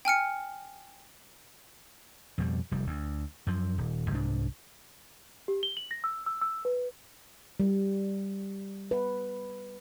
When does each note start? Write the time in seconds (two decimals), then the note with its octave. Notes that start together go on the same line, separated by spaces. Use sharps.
0.05 G5 G#5 F6 C#7
2.38 F2 B2 G3
2.71 F1 G3
2.87 D2
3.47 F#2 F3
3.78 D#1
4.10 C2 G#2 D4
5.48 G4
5.63 G7
5.77 F#7
5.91 A#6
6.04 E6
6.26 E6
6.41 E6
6.65 B4
7.60 G3
8.91 B4